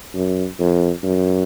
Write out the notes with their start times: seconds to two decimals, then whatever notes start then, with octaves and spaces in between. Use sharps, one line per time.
0.15 F#2
0.59 F2
1.04 F#2